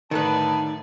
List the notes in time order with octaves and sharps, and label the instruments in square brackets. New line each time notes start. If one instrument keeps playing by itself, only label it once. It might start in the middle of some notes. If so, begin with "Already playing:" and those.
[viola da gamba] A2 D3 D5 [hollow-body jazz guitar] D#3 [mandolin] D#4 A4 B4 [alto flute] A5